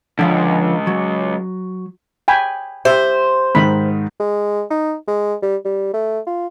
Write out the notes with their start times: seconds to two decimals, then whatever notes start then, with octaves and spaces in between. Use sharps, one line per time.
0.19 C#2 D3 F3 F5
0.87 F#3
2.28 G5 G#5 B5
2.85 G4 C5 E5
3.55 G#2 D#3 D#4 B5
4.20 G#3
4.70 D#4
5.08 G#3
5.42 G3
5.65 G3
5.94 A3
6.27 F4